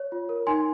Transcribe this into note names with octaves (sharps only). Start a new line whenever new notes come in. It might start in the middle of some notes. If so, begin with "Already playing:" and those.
Already playing: C#5
F4
A#4
D#4 G#5 C6